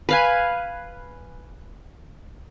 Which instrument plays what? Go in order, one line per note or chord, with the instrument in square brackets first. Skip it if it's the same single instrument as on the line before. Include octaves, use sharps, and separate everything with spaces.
[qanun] B4 F5 G#5